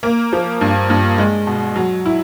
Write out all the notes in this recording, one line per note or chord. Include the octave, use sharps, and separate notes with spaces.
A#3
F3
G2
G2
G#3
B2
F#3
E4